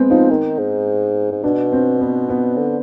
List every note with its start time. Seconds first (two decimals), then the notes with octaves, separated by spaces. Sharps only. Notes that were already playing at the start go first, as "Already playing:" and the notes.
Already playing: G#3 B3 C4
0.10 F3 D#4
0.30 D#3
0.58 G#2
1.32 G#2
1.43 B2 D4
1.72 C4
2.01 B3
2.29 B3
2.57 D3